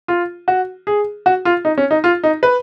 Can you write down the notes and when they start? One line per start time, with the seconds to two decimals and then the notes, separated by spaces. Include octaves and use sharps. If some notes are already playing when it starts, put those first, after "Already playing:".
0.08 F4
0.48 F#4
0.87 G#4
1.26 F#4
1.45 F4
1.65 D#4
1.78 C#4
1.91 D#4
2.04 F4
2.24 D#4
2.43 B4